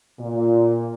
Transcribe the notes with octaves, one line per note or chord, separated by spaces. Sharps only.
A#2